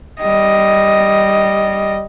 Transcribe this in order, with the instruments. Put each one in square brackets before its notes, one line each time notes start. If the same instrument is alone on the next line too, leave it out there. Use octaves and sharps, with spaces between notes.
[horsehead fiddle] G3 D#5